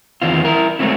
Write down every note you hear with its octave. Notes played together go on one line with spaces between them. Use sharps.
E2 D#3 C4 F4
E4 A#4
F#3 G#3 A3 C4 C#4 E4